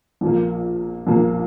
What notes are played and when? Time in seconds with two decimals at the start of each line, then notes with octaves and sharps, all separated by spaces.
0.21 A#1 A#2 F3 A#3
1.07 A#1 A#2 F3 A#3